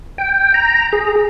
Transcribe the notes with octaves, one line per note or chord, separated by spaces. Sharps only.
G5
A#5
G#4